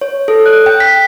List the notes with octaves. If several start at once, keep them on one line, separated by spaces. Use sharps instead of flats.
C#5
A4
F#6
G5
B6